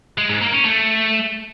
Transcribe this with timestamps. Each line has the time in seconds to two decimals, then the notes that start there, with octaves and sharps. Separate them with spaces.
0.18 G#3
0.29 G#2
0.41 A#3
0.53 C#4
0.64 A3